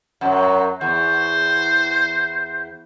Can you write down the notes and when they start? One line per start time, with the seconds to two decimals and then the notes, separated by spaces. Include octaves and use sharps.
0.21 F#2 F#3
0.81 E2 C5